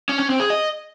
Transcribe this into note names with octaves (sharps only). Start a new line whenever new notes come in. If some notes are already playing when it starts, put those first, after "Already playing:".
C#4
C#4
C4
G#4
D#5